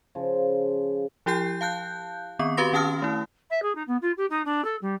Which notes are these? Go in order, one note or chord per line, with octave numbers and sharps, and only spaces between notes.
C#3 F3
F3 E4 G4 G5 G6 C7
F5 A5 F#6 G6
D#3 B3 C4 C#6
F#4 G4 B4 F5 C6 A#6
D#3 C#4 G5 A5 D#6 F6
A3 E4
E5
G#4
D#4
B3
F4
G4
D#4
D4
A4
G3